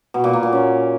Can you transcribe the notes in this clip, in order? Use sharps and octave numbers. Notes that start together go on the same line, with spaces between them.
B2
A#2
A#3
A#2
C#4